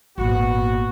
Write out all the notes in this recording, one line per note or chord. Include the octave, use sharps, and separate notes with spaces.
G#1 A#2 B3 F#4